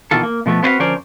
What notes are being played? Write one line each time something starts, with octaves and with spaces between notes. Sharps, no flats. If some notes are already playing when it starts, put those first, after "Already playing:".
B2 D#3 E3 F4 A4
A#3
B2 F3 A3 B3
B3 C4 E4 F#4 B4 F5
D3 F3 C#4 A#4 C5 D5